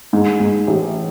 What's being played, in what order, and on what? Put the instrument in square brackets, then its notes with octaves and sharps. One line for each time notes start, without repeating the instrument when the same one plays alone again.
[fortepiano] G#2
G#2
A1